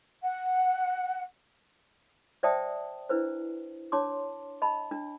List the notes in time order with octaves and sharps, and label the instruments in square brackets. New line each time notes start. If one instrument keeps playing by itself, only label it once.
[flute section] F#5
[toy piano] C5 D5 E5 G5 A5 D#6
D4 E4 B4 C5
D4 C#5 A5 C6 D6
D#5 A5 B5
D4